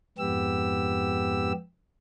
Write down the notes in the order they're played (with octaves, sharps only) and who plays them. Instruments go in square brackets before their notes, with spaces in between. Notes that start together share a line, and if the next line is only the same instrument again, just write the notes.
[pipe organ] F2 G#2 B3 G4 E6